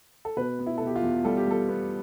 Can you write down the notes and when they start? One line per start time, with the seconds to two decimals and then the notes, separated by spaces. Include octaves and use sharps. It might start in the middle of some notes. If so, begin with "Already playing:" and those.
0.25 A4
0.37 B2 B4
0.59 B3
0.66 E4
0.78 B2 A4
0.87 G4
0.96 F4
1.02 E2
1.24 G3 A4
1.37 G4
1.47 G3 A4
1.69 B3